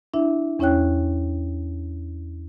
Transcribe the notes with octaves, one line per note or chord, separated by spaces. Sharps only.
D4 E4 E5
E2 C#4 E4 C#5 G5 F#6